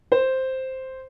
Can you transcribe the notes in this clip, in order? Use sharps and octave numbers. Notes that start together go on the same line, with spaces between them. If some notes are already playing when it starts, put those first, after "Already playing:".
C5